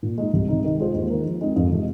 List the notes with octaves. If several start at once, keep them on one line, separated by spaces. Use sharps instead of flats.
A#2
G#3 D#4
C2
C3 G#3 D#4
D#3
G#3 F4 G#4 C5
D#2
D#3 A#3 D#4 A#4
F3
G#3 C4 D#4
F2
C3 G#3